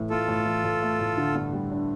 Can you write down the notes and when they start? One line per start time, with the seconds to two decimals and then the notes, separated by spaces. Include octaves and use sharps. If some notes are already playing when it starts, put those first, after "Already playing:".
Already playing: A2 E3
0.10 A3 F4 A4
0.28 A2
0.46 E3
0.64 A2
0.82 A3
0.99 A2
1.17 D3
1.35 G2
1.52 G3
1.71 D4